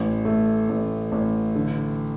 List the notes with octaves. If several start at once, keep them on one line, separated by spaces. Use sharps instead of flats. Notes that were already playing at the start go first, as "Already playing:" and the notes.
Already playing: A1
A3
A1
A1
D3